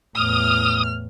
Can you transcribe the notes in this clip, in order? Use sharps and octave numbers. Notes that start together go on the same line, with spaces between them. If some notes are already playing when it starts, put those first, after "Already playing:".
E2 A2 D#6 F6